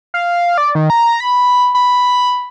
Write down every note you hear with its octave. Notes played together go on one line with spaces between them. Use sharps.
F5
D5
D#3
A#5
B5
B5